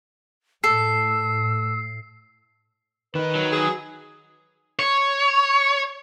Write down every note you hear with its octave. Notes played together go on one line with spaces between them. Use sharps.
A2 A4 E6 C7
D#3 D#4 B4
F#3
G#4
C#5